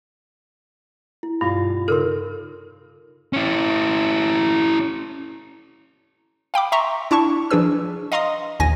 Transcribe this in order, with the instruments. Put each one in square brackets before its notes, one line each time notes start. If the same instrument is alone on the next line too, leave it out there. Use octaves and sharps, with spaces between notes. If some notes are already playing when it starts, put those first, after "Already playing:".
[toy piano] E4
[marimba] G2 [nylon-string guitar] B2 G3 F4
[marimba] C#3 D#4 [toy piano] A4 A#4 C6
[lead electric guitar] C#4 E4
[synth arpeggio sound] F5 G5 B5 D6
E5 A#5 C6 C#6
D4 E4 A5 C#6
F3 D4 G#4 B4 E6
D#5 F5 A#5 C6 D#6
A#1 D#2 D#3 G#5 A#6